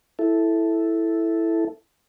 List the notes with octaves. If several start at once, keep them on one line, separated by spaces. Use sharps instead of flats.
E4 A4